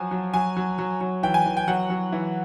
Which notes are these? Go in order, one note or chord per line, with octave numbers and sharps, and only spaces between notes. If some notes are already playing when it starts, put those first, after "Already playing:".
Already playing: F3 F#3 G#5
F#3
F#3 G#5
F#3
F#3
F#3
E3 G5
G#5
E3
G5
F#3 F#5
F#3
E3